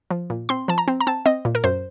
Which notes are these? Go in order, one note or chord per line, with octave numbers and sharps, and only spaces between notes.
F3
A#2
C4 C6
F3 A5
A#5
C4
A#5
C4 A5
C4 D#5
A#2
A#4
F#2 C5